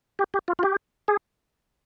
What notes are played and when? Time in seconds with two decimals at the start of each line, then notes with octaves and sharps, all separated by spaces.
0.19 G4
0.34 G4
0.48 F4
0.59 F4
0.63 G4
1.08 G#4